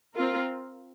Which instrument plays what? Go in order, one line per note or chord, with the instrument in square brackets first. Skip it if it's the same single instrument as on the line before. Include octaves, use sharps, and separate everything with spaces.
[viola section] C4 F4 A#4